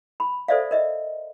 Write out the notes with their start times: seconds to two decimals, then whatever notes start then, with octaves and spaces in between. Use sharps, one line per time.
0.20 B5
0.48 A4 C5 D5 E5 F5
0.71 A#4 D#5 E5